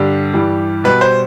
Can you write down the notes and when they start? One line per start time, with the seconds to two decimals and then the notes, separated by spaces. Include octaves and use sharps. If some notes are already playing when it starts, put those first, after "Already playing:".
Already playing: G2 D3 G3 G4
0.34 G2 E3 G3
0.84 B2 G3 B4
1.01 C5